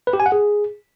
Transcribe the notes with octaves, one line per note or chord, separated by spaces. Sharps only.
B4
G4
G#5
F#5
G#4